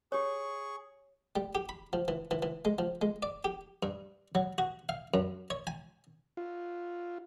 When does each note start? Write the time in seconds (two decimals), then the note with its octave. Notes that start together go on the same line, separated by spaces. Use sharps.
0.12 G4 G#4 C#5 C#6
1.36 G3
1.55 G4
1.69 B5
1.93 F3
2.08 E3
2.31 E3
2.42 E3
2.65 G#3
2.79 F3
3.02 G#3
3.23 D5
3.44 G4
3.83 G2
4.35 F#3
4.58 F#4
4.89 F5
5.14 F#2
5.50 C#5
5.67 G#5
6.37 F4